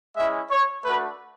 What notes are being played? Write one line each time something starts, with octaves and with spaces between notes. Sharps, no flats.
G#3 C#4 E4 E5
C#5
A3 D4 F#4 B4